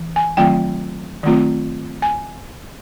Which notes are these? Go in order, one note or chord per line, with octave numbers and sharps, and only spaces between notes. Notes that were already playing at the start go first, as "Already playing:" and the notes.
Already playing: E3
G#5
D#3 F#3 A3 C4 F4 G5
D#3 F#3 A3 C4 F4
G#5